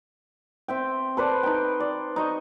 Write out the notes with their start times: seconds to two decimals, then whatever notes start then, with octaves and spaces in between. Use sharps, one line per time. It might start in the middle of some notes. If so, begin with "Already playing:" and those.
0.68 C4 E5 G5
1.17 A4 B4 C5 D5
1.43 D#4 G5
1.80 D5
2.16 D#4 D#5 C#6